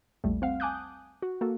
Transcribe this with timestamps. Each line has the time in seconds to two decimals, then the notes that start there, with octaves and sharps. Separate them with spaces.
0.24 A#1 E2 G3 A3
0.42 C4 F5 F#5
0.60 G#5 A5 D6 D#6 F#6 G6
1.22 F#4
1.41 A#3 F#4 A4